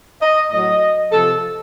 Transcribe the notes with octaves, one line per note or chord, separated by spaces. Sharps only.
D#5
A2 F#3 D#5
C3 F3 A4